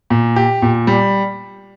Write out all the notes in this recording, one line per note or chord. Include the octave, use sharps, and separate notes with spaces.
A#2
G4
A#2
G3